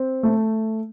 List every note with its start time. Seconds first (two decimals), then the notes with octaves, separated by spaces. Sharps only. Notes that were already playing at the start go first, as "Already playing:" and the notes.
Already playing: C4
0.23 A3